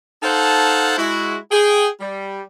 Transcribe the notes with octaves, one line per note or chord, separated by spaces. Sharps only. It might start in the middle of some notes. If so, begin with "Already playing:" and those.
D#4 A4 C5 F5 F#5 A5
G#3 E4 F#4
G#4 G5
G3